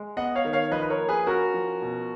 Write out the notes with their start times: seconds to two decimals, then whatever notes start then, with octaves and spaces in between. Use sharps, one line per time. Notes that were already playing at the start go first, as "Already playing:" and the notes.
Already playing: G#3
0.17 B3 D#5 F#5
0.35 C#5 F5
0.45 D#3
0.53 C#5 F5
0.71 F3 B4 D#5
0.82 B4
0.90 A#4 C#5
0.99 A#3
1.09 G#4 B4
1.27 C#4 F#4 A#4
1.54 F3
1.82 B2